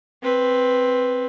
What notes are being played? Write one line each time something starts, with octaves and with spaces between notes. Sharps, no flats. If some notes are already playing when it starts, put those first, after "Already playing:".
C4 B4